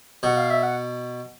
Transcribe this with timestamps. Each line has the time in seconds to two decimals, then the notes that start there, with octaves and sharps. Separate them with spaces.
0.23 B2 F#5
0.37 F5
0.50 E5
0.63 F#5